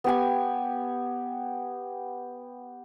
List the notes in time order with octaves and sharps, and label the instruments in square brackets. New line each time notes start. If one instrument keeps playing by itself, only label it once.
[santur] B3 G4 G#5